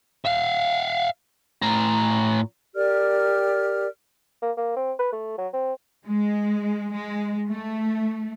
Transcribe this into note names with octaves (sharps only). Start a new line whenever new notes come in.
E5 F5
A2 A#5
G4 A#4 D5 F6
A#3
A#3
C4
B4
A3
F#3
C4
G#3
G#3
A3